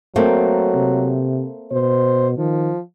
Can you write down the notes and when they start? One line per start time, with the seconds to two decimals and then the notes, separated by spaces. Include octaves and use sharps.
0.16 F#3 A3 A#3 C4
0.75 C3
1.72 B2 C5
2.37 D#3 F3